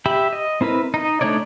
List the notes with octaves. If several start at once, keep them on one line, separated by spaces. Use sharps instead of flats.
G4 E5 B5
D#5
C4 E4 A#4 B4
D#4 D#5
A3 D4 D#4 C#5 D5